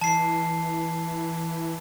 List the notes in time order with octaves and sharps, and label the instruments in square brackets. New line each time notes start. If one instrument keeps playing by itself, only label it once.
[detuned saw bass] E3 [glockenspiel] A5 C7